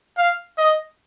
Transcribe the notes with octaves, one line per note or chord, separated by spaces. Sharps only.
F5
D#5